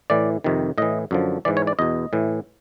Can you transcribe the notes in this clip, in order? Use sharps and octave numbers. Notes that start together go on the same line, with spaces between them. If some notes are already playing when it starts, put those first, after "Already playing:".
A2 E3 D5
F2 C3 D#3
A2 E3 D#5
F#2 D3 F3
G#2 E3 D5
C#5
D5
E2 B2 D#5
A2 E3